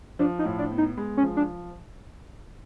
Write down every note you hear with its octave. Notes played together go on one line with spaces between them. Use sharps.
F3 D4
D#4
A2
D4
B3
D#4
G#3
C#4
F3
D4